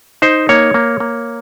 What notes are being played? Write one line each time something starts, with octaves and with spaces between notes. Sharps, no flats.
D#4 C5
A#3 C#5
A#3
A#3